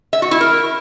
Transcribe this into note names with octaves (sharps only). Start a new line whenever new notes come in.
E5
F#4
E4
A#4